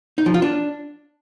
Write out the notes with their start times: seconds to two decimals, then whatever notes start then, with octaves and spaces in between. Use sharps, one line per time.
0.18 D#4
0.26 F3
0.34 F4
0.42 D4